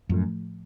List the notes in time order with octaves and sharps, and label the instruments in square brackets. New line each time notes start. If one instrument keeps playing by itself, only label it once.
[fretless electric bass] F#2 [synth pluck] A2 F3 A3